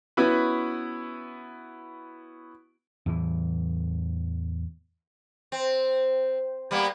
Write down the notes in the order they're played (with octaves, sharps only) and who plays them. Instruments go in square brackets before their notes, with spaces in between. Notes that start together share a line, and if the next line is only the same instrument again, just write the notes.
[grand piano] B3 C#4 E4 F#4 B4
[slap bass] E2 A2 E3
[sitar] C4
G3 A#3 B3